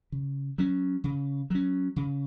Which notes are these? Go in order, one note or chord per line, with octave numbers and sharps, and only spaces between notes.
C#3
F#3 C#4
C#3
F#3 C#4
C#3